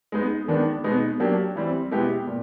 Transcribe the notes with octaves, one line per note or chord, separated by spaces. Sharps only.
G#3 B3 D#4
D#3 G#3 B3 D4
B2 G#3 B3 D#4
F#3 A#3 D4 G4
E3 G3 C4
B2 G#3 B3 E4 G4
A#2